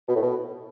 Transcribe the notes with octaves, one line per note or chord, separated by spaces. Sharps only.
B2
A2
B2